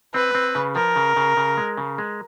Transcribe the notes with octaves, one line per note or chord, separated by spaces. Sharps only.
C4 B4
C4
C#3
F3 A#4
C#3
C#3
C#3
G#3
C#3
G#3